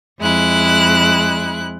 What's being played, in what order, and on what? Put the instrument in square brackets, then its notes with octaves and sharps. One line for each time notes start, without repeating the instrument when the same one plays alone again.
[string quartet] F2 G#3 E4 F#6